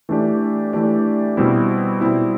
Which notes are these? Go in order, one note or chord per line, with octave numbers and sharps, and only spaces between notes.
E3 A3 D4 G4 D5
E3 A3 D4 G4 D5
B2 G3 C4 E4
B2 G3 C4 E4